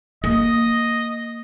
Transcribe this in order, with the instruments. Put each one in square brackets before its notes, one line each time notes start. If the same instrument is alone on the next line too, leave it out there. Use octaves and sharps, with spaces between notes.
[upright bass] A#3 [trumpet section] D#5